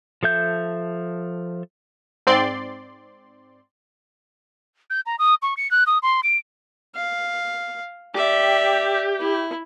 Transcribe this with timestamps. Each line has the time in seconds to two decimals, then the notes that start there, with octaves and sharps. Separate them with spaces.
0.23 F3 A4 E5 G6
2.27 G#2 C4 D5 C6
4.90 G6
5.06 A#5
5.19 D#6
5.42 C#6
5.57 C#7
5.71 F#6
5.87 D#6
6.02 C6
6.23 D7
6.95 F5
8.15 G4 D5 E5
9.20 E4